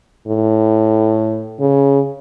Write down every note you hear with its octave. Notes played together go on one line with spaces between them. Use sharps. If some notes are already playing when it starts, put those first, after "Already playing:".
A2
C#3